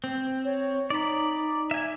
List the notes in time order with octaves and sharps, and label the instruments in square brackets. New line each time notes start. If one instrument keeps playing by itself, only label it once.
[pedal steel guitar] C4
[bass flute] C#5
[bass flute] D#4 [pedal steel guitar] D5 B5
[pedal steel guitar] E5 G#5